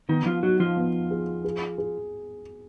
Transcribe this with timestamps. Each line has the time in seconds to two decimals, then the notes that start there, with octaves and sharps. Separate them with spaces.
0.09 D#3 B3 D#4
0.26 F3 F4
0.43 F#3 D#4 F#4
0.60 F3 F4
0.77 B3
1.11 G#4
1.44 G#4
1.78 G#4